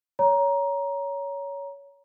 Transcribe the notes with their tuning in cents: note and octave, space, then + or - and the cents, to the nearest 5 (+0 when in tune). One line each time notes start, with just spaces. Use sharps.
C#5 +20 A#5 +15